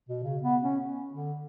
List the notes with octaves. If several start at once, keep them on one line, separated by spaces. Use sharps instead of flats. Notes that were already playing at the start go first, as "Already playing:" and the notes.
B2
C#3
B3
C#4
D3